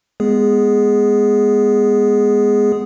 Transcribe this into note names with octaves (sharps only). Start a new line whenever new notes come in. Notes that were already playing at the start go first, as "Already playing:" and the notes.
G#3 B3 G#4